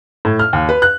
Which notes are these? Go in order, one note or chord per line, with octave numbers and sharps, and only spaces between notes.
A2
F6
D#2
B4
F#6